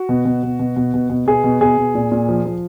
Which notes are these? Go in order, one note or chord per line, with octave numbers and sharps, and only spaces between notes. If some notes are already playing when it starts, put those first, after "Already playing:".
Already playing: F#4
B2
B2
B2
B2
B2
B2
B2
B2 G#4
B2
B2 G#4
B2
A#2
A#2
F3
F3